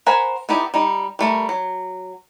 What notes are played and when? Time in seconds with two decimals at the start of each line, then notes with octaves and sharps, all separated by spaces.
0.06 A#4 C5 F#5 G#5 B5
0.49 B3 D#4 E4 G4 D5
0.74 G3 D#4
1.19 G3 A3 A#4
1.49 F#3